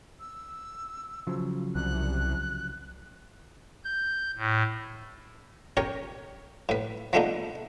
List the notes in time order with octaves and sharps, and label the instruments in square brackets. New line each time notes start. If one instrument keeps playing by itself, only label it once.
[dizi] E6
[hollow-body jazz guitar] C#3 F3 F#3
[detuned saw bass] C2 [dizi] F#6
[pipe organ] G6
A2
[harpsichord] C#4 G4 A#4 C#5
A2 B4
F3 G#3 A3 B3 D4 D#4